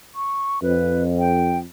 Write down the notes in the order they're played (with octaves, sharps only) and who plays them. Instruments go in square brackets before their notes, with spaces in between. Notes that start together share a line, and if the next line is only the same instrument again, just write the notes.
[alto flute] C#6
[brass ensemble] F2 [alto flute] B4
[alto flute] G5